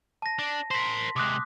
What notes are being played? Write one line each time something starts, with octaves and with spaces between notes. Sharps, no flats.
A5 A#6
D4
A#4 C5 C6 B6
C3 G#3 D6 D#6 F#6